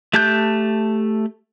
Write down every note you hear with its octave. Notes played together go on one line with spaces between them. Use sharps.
A3 G4 A5 F#6 G6